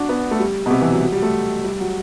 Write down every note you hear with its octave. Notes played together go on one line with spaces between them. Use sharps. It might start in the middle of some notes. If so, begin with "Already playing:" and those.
Already playing: D4 F#4
B3
A3
G3
B2
C3
E3
F#3
F#3
G3
A3
G3
F#3